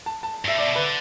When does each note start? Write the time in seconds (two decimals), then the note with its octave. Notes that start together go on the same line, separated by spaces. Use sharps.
0.06 A5
0.23 A5
0.45 G2 E5
0.55 A2 D5
0.65 B2
0.76 D3 B4